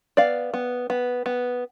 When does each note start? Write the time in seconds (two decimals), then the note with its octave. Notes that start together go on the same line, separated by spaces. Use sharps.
0.17 B3 D5 F5
0.54 B3
0.90 B3
1.26 B3